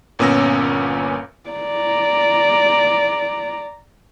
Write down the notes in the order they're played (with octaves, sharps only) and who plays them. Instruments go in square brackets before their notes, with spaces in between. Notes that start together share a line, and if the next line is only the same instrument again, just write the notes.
[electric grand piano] G1 A#2 B3 C#4 E6 A#6
[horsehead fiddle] D5 A#5